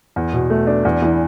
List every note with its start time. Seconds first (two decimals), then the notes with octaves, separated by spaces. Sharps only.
0.16 E2
0.33 B2
0.50 A3
0.67 D4
0.85 E2
1.02 E3